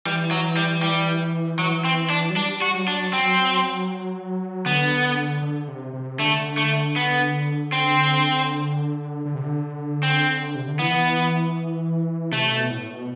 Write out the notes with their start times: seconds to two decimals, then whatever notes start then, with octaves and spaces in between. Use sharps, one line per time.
0.06 E3 G3
0.31 F#3
0.56 G3
0.83 G3
1.59 E3 F#3
1.85 C4
2.10 D4
2.30 F#3
2.35 G3 D4
2.62 F#4
2.74 F#3
2.88 D4
3.13 F#3 C4
4.65 D3 B3
5.42 D3
5.68 C3
5.94 C3
6.19 D3 A3
6.57 A3
6.96 B3
7.72 C4
9.25 D3
9.35 C3
9.43 D3
10.03 C4
10.55 C3
10.68 D3
10.79 E3 B3
12.32 C3 A3
12.51 B2
12.71 A2
12.90 B2